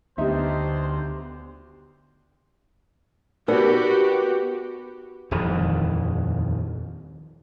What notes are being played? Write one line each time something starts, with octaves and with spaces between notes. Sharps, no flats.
D2 B3 D#4 G4 C5 E5 A#5
B3 D#4 F#4 G4 A#4 D5
D#1 F2 D#3 E3